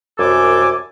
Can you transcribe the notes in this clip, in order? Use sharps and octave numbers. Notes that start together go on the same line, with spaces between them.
C2 F#2 A4 G#5 D6